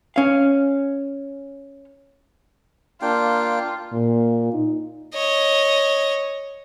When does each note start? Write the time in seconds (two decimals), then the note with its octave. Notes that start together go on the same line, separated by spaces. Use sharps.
0.16 C#4 F5
3.02 A#3 D4 F4 G5
3.93 A#2
4.53 D#4
5.14 C#5 D#5